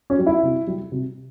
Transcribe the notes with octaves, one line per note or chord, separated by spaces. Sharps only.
C#4
G3
E4
C3
G3
C3